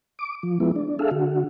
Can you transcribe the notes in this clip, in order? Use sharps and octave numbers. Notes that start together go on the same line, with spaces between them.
D6
F3
F3 G#3 B3 E4
D4
G#4 A4 E5 F5
D3 F#4